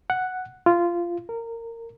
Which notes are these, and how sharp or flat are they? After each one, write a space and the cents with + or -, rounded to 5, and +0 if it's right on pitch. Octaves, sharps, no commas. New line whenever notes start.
F#5 +0
F4 -15
A#4 -20